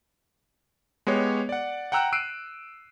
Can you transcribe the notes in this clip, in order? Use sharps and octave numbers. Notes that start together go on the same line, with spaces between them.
G#3 B3 G4 C#5
D5 F#5
F#5 G5 A#5 E6 F#6
E6 F#6 C7 D7 D#7